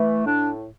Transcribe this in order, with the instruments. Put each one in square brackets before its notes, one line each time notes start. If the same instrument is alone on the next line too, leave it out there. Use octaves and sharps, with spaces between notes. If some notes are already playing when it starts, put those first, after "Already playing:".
Already playing: [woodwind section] E3 A3
A2 D4